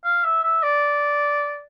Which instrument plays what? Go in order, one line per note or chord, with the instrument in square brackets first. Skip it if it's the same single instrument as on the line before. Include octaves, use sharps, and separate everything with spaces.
[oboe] F5
E5
E5
D5